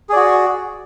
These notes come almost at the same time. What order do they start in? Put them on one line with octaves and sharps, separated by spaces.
G#4 D5 F#4